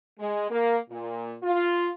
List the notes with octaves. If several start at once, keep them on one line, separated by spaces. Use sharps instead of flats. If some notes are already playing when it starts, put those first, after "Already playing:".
G#3
A#3
A#2
F4